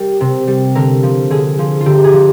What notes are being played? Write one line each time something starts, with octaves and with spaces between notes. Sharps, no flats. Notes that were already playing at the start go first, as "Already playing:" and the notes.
Already playing: G3 A#4
C3
G3
D3 A#4
F3
D3 G#4
F3
F4
D3 G4
G#4
F3